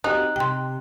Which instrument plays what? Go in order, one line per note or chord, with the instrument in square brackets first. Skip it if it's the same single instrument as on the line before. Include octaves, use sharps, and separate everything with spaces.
[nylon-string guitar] C4 F#4 G4 [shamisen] D#4 [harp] F#6
[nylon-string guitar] C3 G4 [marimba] G5 C6